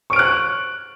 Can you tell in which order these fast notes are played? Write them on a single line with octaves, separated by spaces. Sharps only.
C#6 D7 F6 F#6